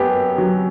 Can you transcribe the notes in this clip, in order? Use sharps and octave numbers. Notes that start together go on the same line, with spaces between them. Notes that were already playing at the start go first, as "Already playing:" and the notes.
Already playing: F#2 B3 G4
F#3